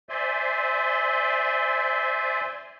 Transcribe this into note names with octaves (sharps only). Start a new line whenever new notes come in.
C5 D5 E5 G#5 C6